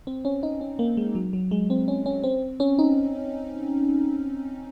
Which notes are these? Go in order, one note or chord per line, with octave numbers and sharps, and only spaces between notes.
C4
C#4
D#4
C#4
A#3
G#3
F#3
F#3
G#3
C4
C#4
C#4
C4
C#4
D#4